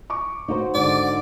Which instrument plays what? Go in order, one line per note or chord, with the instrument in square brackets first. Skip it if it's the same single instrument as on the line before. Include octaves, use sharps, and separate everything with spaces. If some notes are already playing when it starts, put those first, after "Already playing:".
[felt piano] C#6 D6
[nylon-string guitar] D#4 F#4 C5
[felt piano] G#2 D3 [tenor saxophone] D5